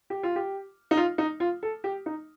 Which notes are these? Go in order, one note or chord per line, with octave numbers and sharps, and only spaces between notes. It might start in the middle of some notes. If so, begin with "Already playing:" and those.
G4
F4
G4
D#4
F4
D#4
F4
A4
G4
D#4